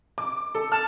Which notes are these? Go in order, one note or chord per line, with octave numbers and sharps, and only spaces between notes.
D6
A4
A5 F6